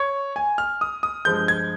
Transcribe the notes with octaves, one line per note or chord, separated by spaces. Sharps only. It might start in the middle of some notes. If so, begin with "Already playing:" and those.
Already playing: C#5
G#5
F6
D#6
D#6
G2 F3 G#3 G6
G#6